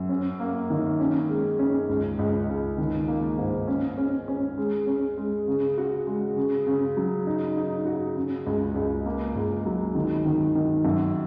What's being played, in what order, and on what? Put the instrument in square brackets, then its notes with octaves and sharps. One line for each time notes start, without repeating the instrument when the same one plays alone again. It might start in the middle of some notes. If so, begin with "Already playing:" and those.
Already playing: [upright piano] F#2
C#4
A#3
D#3
C#4
G#3
C#4
C#2
C#2
C#2
D#3
A#3
G#2
C#4
C#4
C#4
G#3
C#4
G#3
C#3
F#4
G#3
C#3
C#3
F#3
D#4
D#4
F#4
C#3
C#2
C#2
A#3
C#2
F#3
D#3
D#3
D#3
F#2